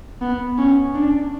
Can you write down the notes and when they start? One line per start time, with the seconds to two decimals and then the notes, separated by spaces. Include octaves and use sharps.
0.22 B3
0.58 C#4
0.95 D4